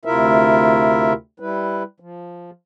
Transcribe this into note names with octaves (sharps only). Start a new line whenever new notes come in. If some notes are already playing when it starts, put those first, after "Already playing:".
D2 C3 E4 F4 A#4 E5
G3 E4 B4
F3